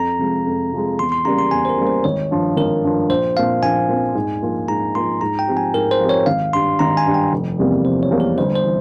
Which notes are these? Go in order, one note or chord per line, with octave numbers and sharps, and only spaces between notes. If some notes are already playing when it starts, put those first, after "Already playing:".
Already playing: F2 A#5
C3 F3 G#3
F2
C3 F3 G#3
E2 C6
C6
C#3 G3 A#3 A#5
C6
E2 G#5
C5
A#4
C#3 G3 A#3
C5
G#1 C#5
G2 F3
G#1 A#4
G2 F3
A#1 C5
A#2 F3 C4 F5
A#1 G#5
A#2 F3 C4
G#2
F3 A#3 F4
G#2 A#5
F3 A#3 F4 C6
G#2 A#5
G5
F3 C4 G4
G#5
G#2 A#4
C5
F3 C4 G4
C#5
G#1 F5
G2 G3 C6
G#1 A#5
G#5
G2 G3
G5
F1
E2 C3 G3 A#3
F1 C5
C#5
E2 C3 G3 A#3
A#4
G1 C5
C5
E3